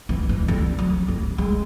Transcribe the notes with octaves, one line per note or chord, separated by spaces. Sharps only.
E3
E3
D3
F#3
E3
G#3